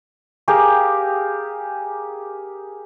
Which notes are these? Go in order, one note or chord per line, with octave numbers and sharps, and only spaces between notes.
G4 G#4 A#4 F5